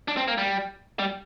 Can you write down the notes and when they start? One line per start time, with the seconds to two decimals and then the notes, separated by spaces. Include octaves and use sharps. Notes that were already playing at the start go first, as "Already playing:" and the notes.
0.08 D4
0.17 C4
0.28 A#3
0.38 G3
0.99 G3